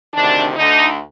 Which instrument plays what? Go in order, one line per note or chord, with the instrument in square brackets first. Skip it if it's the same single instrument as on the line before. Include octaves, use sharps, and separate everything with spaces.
[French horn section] D2 C3 D#3 D4
D2 D3 D#4